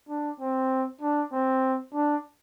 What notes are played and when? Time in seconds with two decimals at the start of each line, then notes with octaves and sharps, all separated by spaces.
0.09 D4
0.40 C4
1.01 D4
1.33 C4
1.94 D4